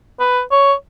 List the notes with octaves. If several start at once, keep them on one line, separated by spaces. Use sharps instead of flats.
B4
C#5